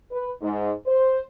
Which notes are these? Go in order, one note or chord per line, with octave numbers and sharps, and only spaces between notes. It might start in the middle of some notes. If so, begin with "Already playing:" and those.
B4
G#2
C5